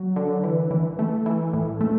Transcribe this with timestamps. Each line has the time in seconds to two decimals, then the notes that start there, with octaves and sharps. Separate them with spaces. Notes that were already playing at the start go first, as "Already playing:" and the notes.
Already playing: F#3
0.16 D3
0.44 E3
0.71 E3
0.99 A3
1.26 E3
1.53 A2
1.81 A3